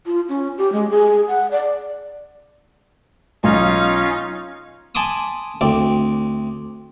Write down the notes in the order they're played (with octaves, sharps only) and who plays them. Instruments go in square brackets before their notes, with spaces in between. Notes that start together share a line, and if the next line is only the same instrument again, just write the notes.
[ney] F4
C#4
G4
G#3
G#4
F#5
D5
[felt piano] B1 [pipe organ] C#4 F4 [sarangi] D#4
[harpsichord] G#5 A5 B5 C6 D6 D#6
D2 C4 D5